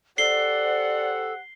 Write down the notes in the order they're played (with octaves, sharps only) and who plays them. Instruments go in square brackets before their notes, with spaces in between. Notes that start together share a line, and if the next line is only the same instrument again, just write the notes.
[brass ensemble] G4 C5 F#5 [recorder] A4 [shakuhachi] D5 [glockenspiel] C7 G7